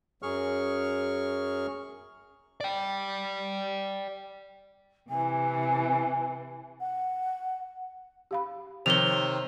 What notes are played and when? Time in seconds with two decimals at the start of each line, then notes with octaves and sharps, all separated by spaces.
0.22 F#2 F#3 G#4 C#6 F6
2.60 D5 G5
5.09 C3 E3 G#5
6.81 F#5
8.31 G4 F5 B5
8.86 C3 D#3 F3 C5 C#5 F7 G7